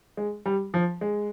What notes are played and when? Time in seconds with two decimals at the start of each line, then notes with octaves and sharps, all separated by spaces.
0.17 G#3
0.46 G3
0.74 F3
1.01 G#3